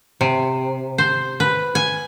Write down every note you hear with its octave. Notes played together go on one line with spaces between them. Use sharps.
C3
C5
B4
G#5